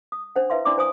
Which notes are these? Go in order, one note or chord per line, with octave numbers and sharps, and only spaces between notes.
D#6
D4 C5 F#5
E4 B4 E5 F5 C6
D4 E4 D5 C6 D6
C5 G#5 D#6